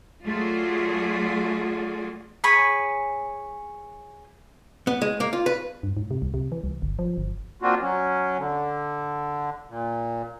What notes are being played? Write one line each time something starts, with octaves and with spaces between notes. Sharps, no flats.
F#3 A3 F4 F#4 G#4 D5
G#4 C#5 G#5 B5
B3
G#3
A#3
F4
B4
G2
G#2
C3
C2
C3
E3
C2
G1
F3
G1
A#3 C4 D4 F4 F#4
F#3 C#4
D3
A#2